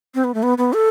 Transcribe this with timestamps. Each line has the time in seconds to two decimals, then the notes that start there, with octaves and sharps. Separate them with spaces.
0.15 C4
0.24 B3
0.34 A3
0.43 B3
0.58 B3
0.73 A4